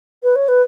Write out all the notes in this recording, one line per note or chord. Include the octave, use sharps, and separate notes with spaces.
B4
C#5
B4